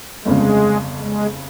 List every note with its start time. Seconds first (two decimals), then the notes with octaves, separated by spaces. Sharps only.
0.25 G1 F2 C#3 G#3
1.00 G#3